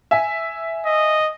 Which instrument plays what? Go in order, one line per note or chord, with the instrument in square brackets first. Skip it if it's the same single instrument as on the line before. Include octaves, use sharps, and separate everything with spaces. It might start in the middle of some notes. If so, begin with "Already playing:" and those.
[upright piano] E5 G#5
[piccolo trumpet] D#5